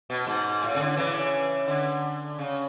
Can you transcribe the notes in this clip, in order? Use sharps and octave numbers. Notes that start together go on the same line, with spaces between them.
B2
G#2
A2
C#3
D3
C#3 E3
D3
C#3